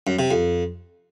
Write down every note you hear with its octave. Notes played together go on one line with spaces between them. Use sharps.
F#2
C3
F2